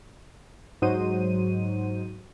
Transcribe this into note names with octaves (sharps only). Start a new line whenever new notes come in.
G#2 F#3 D#4 F#4 C5 D#7